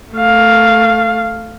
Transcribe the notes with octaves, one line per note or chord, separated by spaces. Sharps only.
A3 F5